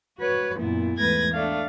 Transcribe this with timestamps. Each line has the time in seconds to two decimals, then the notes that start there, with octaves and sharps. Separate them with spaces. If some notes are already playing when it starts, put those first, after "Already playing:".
0.18 F#4 B4 C#5
0.58 F#2 A#2 B3 E4
0.98 E2 G#2 A3 B4 G#6 A#6
1.33 A3 D4 F5